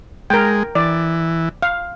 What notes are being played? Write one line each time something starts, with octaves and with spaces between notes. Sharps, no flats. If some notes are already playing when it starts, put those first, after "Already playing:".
G#3 A#4 G5
E3 D5
F5